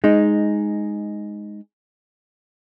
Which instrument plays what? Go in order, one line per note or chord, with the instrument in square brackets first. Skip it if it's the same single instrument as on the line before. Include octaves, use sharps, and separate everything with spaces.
[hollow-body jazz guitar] G#3 D#4